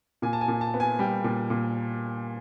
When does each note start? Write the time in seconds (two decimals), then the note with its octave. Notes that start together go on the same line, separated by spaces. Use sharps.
0.22 A#2 G#5
0.33 A5
0.41 G#5
0.48 A#2
0.61 A5
0.74 B3
0.80 G#5
0.99 G3 G5
1.24 A#2
1.50 A#2